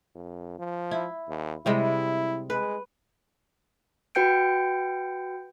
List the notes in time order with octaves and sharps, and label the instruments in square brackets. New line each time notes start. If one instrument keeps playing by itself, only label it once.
[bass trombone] F2
F3
[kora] E4
[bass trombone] D#2
[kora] C3 G3 G#3 [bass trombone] E4
[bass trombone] G#3 [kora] B4
[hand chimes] F#4 B4 G5 G6 C#7 D7